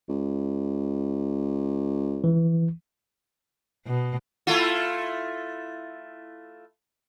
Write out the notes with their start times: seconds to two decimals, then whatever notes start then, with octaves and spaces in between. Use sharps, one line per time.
0.09 C#2
2.24 E3
3.86 B2
4.47 A3 E4 F4